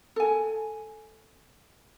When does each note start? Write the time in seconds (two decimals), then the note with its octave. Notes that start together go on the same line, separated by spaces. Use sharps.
0.16 A4 G#5